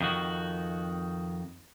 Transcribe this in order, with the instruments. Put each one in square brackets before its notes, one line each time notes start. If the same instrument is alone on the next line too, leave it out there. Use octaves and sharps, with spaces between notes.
[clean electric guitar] F2 D#3 F#4